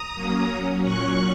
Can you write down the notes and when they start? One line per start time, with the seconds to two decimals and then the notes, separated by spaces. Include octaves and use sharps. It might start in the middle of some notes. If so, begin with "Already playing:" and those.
Already playing: A#5 D#6
0.15 F#3 A#3 C#4
0.48 F#3 C#4
0.82 A#2 F#3 C#4 C#6 F#6